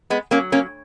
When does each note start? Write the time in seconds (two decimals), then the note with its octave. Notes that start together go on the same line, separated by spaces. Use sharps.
0.10 G#3 B3
0.31 F#3 A#3 C#4
0.52 A#3 C#4